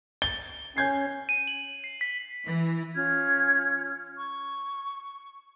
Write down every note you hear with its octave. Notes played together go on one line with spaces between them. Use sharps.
A6 G7
C#4 G6 G#6 C7
D#7
F#7
C7
B6
E3
C#4 F4 F6 G#6
C#6